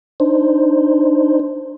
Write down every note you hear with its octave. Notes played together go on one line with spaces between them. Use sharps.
D4 D#4 C5